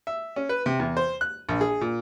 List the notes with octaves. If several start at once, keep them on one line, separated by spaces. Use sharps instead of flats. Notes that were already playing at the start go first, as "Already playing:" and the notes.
E5
C#4
B4
C3
E2
C5
F#6
A#1
G#4
A#2